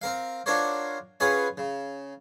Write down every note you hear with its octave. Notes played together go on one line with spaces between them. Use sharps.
C4 A#4 F5
D4 F4 F#4 A#4 C5 C#5
C#4 F4 G#4 B4 C#5 F#5
C#3